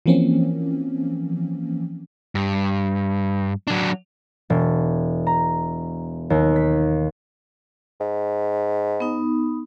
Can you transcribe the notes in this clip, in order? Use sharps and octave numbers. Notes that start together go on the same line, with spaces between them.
E3 F3 A#3 C4 C#4
G2
F#3 D4
E1
A#5
D#2
B6
G#2
B3 D#4